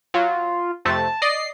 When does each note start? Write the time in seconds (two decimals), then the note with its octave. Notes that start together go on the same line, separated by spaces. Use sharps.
0.14 F#3 F4
0.85 F2 C3 A3 A5
1.22 D5 D#5 C7